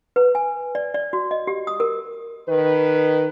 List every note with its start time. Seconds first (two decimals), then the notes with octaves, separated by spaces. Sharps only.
0.16 B4
0.35 G#5
0.75 D5
0.94 D5
1.13 F#4
1.31 D#5
1.47 G4
1.67 D#6
1.80 A#4
2.49 D#3 B4